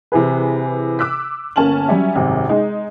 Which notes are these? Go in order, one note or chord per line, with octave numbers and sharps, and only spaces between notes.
C3 E3 G#4 B4
D6 E6 F#6 B6
G1 A#3 C#4 A5 F6 F#7
F#3 G3 C#4 D5 E5
G#1 F#2 C3
G#3 D#4